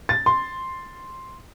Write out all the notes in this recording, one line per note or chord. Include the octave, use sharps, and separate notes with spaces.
A6
C6